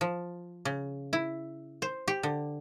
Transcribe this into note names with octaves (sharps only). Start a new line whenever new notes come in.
F3
C#3
E4
C5
G4
D3